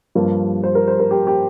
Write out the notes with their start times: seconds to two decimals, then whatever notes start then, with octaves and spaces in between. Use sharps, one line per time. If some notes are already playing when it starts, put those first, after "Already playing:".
0.15 G2 F3 A#3
0.63 C5
0.75 A#4
0.88 C5
0.99 A#4
1.11 G4
1.27 G4